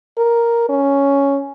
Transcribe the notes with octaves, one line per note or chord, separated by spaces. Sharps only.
A#4
C#4